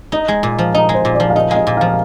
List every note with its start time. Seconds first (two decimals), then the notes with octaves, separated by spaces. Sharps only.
0.12 D#4 D#5
0.28 G#3
0.43 A#2
0.59 F3
0.74 D#4 D#5
0.89 G#3
0.94 C5
1.05 A#2
1.15 D5
1.20 F3
1.30 F5
1.35 D#4 D#5
1.51 G#3 F5
1.56 D#5
1.67 A#2
1.77 F3 F5